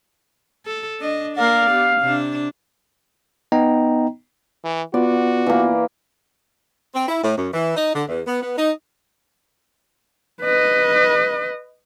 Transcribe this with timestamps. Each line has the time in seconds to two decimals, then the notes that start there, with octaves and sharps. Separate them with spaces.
0.66 A4
1.00 D4 D#5
1.37 A#3 A#4 D5 F5
1.70 B3 G4
2.01 C3 D4
3.52 B3 D#4 D#5 G5 A#5
4.64 E3
4.94 B3 F4 F#4 B4 D5
5.46 E3 A#3
6.95 C4
7.08 E4
7.24 A2
7.37 F#2
7.54 E3
7.76 D#4
7.94 D3
8.08 E2
8.27 B3
8.42 B3
8.57 D#4
10.41 B4 D#5